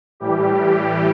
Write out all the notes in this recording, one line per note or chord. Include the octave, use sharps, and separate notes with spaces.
A2 E3 G3 G4